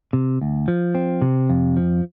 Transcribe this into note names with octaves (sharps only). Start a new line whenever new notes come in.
C3
D2
F3
C4
C3
F2
F3